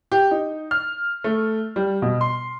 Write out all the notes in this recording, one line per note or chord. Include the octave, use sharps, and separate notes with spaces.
G4
D#4
F6
A3
G3
B2
C6